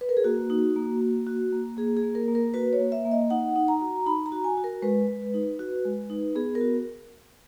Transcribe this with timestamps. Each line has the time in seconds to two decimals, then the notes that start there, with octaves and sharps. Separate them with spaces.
0.01 B4
0.09 A#4
0.17 G#4
0.24 A#3 F#4
0.50 D#4
0.76 A#3
1.01 A#3
1.27 F#4
1.53 A#3
1.77 A#3 G#4
1.97 G#4
2.03 A#3
2.15 A#4
2.28 A#3
2.35 A#4
2.54 F#4 B4
2.73 C#5
2.79 A#3
2.92 E5
3.05 A#3
3.12 D#5
3.30 D#4 F#5
3.56 D#4
3.68 A#5
3.81 F#4
4.06 D#4 B5
4.26 A#5
4.32 F#4
4.44 G#5
4.58 F#4
4.64 A#4
4.82 G#3 B4
5.08 G#3
5.34 D#4
5.59 F#4
5.85 G#3
6.10 D#4
6.35 B3 G#4
6.55 A#4
6.61 F#4